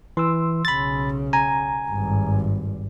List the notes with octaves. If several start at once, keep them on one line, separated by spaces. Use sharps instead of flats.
E3 C6 E6
B1 C#3 B5 A6
G#5 A#5
G#1 G2